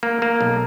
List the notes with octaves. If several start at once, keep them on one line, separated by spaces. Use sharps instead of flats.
A#3
A#3
B1